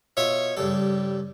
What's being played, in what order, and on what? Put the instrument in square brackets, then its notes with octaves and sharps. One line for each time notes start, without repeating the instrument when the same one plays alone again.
[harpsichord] B2 F4 E5 [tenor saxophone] C#5
[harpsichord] G2 C#3 A4 [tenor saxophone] G3